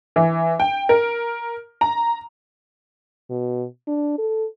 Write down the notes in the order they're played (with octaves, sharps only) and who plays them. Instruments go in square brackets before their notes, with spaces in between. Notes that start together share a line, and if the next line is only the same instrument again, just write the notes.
[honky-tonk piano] E3
G5
A#4
A#5
[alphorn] B2
D4
A4